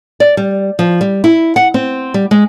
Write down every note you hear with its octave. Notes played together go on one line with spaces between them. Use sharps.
D5
G3
F3
G3
E4
F#5
C4
G3
G#3